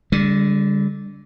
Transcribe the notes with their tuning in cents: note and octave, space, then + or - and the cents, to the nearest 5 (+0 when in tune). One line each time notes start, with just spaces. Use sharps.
D3 -20 G3 +35